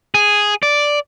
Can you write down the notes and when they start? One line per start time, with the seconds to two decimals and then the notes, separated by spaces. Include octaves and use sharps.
0.15 G#4
0.63 D5